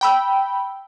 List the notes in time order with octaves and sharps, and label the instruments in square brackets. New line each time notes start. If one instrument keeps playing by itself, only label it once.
[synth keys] G5 B5 E6